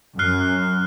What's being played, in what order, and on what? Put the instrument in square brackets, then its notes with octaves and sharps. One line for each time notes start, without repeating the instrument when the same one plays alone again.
[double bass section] F#2 [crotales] F6 F#6 C7